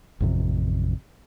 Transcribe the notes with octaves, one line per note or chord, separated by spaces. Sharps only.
A1 F2 C3